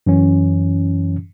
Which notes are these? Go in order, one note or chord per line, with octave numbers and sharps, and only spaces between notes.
F#2 E3 C#4